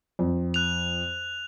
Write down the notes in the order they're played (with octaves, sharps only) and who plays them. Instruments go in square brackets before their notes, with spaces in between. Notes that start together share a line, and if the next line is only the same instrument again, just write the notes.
[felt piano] F2
[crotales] F#6 F7